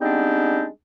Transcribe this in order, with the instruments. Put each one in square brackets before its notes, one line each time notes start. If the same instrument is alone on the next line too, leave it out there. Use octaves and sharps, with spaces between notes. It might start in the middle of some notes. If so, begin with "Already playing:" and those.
[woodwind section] G3 G#3 B3 C4 D4 D#4